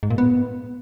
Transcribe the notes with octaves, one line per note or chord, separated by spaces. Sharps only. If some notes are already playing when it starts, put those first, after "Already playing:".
G#2
A#2
B3